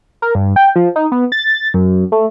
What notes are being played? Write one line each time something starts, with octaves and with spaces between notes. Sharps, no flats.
A#4
G2
G5
F3
D#4
B3
A6
F#2
A3